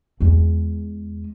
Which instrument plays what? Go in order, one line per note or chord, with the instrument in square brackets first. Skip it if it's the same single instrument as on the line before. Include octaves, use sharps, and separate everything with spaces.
[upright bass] E2 G#3